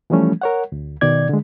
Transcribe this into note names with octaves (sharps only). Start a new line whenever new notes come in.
E3 F3 G3 A3 C#4
A#4 C#5 F#5
D2
B2 D#3 D5 G#6
D3 G#3